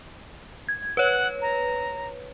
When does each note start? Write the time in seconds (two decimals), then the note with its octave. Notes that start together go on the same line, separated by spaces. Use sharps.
0.69 G#6
0.97 B4 C#5 F#5
1.41 A#5